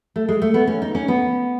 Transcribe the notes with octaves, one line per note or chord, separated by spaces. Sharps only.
A3
G#3
A3
B3
C#4
D#4
C#4
B3